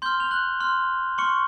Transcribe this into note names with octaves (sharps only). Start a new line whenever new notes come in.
C6 F6 G6 G7
F7
F#6 F#7
C6 F6
C6 C#6 F6 C#7